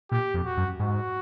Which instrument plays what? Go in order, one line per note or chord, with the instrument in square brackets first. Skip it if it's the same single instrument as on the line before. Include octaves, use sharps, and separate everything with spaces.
[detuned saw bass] A#2 [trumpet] G4
[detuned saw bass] F2
[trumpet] F#4
[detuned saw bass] F#2
[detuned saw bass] G#2 [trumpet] F#4